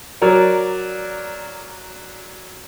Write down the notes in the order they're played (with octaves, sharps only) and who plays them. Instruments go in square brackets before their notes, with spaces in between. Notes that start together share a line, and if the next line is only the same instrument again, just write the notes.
[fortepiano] F#3 A#4 D5